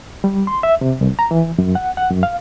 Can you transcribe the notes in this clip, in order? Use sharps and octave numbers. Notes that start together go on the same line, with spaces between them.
G3
C6
E5
C3
C2
A#5
E3
F#2
F#5
F#5
F#2
F5